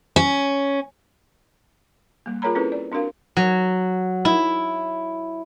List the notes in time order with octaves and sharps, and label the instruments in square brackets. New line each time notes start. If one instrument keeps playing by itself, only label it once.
[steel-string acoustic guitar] C#4
[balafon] G3 A#3
F4 G#4 A#4 C#5 A#5 B5
C4 C#4 E4 G#4 A4 B4
D5
C4 D4 F#4 A#4 F5
[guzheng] F#3
E4